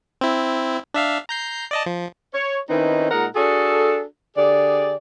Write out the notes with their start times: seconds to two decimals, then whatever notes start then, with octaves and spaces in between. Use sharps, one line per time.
0.21 C4 E4
0.94 D4 E5 F5
1.29 A#5 G6 C7
1.71 D5 D#5 A5
1.86 F3
2.34 C#5
2.70 D#3 C4 C#4 D#4 E4 B4
3.11 A#2 G#3 D#4 A#4 F#5
3.36 D4 F#4 G#4 A4
4.36 D3 G4 G#4 D5